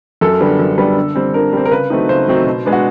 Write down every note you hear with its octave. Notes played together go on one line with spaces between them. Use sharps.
F#2 A4
D3 G3 B3
F#2
D3 G3 B3
D3
G3 C4
D3 A#4
G3 C4
A#4
C#3 B4
F#3 A3 C4 D#4
C#3 C5
F#3 A3 C4 D#4
B2
G#3 B3 D4
F#4